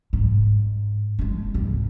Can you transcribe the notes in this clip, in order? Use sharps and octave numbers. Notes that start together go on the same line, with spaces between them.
G#2
G#3 D4
G#1 C#2